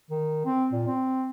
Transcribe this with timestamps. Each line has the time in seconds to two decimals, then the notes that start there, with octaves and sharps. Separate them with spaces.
0.11 D#3
0.45 C4
0.72 A#2
0.87 C4